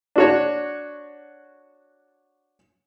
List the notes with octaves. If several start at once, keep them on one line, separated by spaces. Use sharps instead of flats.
D4 F#4 C#5